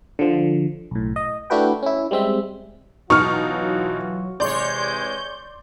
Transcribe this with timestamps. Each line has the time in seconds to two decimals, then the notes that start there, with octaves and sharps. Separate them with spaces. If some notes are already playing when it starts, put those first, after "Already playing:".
0.19 D3 F3
0.91 B1 A2
1.16 D#5
1.50 A3 D4 E4 F#4 B4 G5
1.83 C#4 E4
2.11 G3 G#3 C4 E5
3.10 B2 E3 F#3 D#4 F4 F#4 C#6 F6
4.40 C3 E3 G#3 C#5 D5 C6 G6